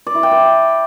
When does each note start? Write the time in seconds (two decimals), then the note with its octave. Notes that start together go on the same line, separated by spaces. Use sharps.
0.06 D5
0.15 E4
0.23 G5
0.31 D5